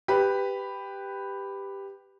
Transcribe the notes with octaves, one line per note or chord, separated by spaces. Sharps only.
G4 B4 B5